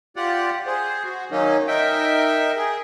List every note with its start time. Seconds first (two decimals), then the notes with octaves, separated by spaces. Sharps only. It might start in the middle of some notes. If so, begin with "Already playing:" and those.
0.16 F4 G4 D5 F#5
0.66 G#4 C5
1.04 F#4
1.31 D#3 F#3 A#3 C#4 D#4
1.68 D#4 A#4 E5 G5
2.56 G#4